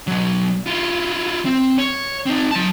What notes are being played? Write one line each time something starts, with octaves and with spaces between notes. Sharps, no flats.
B2 F#3
E4 F4
C4
C#5
C4 D#4
F#3 A5